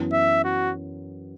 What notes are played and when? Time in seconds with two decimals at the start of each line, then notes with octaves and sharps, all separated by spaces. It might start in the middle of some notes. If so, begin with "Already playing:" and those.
Already playing: F#2 E3 B3
0.12 E5
0.44 F#4